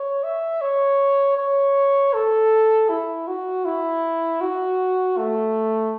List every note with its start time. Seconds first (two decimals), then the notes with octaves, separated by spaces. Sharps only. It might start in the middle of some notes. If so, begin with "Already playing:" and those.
Already playing: C#5
0.24 E5
0.61 C#5
1.37 C#5
2.13 A4
2.89 E4
3.28 F#4
3.65 E4
4.41 F#4
5.18 A3